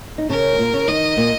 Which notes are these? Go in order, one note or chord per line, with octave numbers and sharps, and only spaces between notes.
D#4
C#3 C#4 A#4
G#3
A#2 A#3
C#3 C#4
D#3 D#4 D#5
A#2 A#3